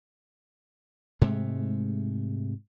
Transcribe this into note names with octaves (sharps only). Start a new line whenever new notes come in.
G#2 C3 G#3 A3